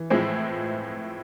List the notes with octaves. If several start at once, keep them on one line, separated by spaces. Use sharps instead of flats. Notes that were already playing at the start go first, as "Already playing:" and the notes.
Already playing: E3
A2 F3 G#3 C4 E4